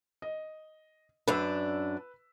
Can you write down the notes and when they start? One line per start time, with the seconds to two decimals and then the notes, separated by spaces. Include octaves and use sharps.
0.22 D#5
1.28 F#2 D4 B4 E6